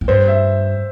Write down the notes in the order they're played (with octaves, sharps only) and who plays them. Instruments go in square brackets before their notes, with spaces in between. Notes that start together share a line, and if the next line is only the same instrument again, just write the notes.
[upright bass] A2
[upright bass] G2 [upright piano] C5
[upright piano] E5